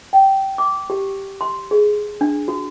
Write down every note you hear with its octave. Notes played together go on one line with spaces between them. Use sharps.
G5
D6
G4
C6
G#4
D4
F#4